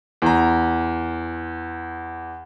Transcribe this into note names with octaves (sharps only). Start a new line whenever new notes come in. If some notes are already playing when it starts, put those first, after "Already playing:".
E2 A#5